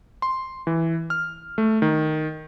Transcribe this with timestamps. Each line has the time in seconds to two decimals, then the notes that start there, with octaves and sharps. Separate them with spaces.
0.22 C6
0.67 E3
1.10 F6
1.58 A3
1.82 D#3